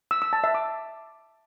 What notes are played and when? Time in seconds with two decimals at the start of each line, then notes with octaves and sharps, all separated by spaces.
0.11 E6
0.22 E6
0.33 A5
0.44 E5
0.55 D6